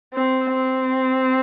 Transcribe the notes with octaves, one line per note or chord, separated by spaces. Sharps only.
C4
C4